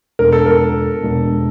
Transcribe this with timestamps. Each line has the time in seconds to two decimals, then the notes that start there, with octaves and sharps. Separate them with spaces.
0.19 E2 B2 G#3 B3 D4 A#4
0.33 A4
0.46 A#4
1.04 E2 B2 G#3 B3 D4